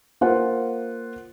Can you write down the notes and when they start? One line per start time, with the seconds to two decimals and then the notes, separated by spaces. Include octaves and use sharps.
0.21 A#3 F4 C5 F#5